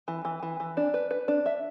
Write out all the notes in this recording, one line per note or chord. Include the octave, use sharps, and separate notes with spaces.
E3
E3
E3
E3
D4
B4
B4
D4
E5